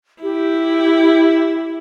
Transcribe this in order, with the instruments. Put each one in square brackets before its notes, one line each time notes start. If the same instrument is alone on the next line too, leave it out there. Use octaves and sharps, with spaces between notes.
[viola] E4 [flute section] G4